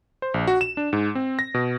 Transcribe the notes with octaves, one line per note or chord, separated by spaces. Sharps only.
C5
A#1
F#4
E7
D4
G#2
C4
A#6
B2